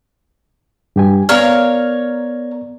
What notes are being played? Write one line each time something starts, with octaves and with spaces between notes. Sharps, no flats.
G2 G4 G#5
B3 A#4 C#5 D5 F5